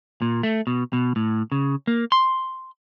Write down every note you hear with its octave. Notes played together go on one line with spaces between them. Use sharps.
A#2
A3
B2
B2
A2
C#3
A#3
C6